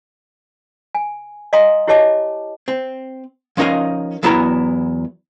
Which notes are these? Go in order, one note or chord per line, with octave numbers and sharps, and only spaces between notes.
G#5
D#5 F5 G#5 A#5 C6 D#6
E4 G4 C#5 D#5 A5 D6
C4
F3 C#4 D#4 A#4 D#5 F5
E2 F#3 B3 E4 A#4 A#5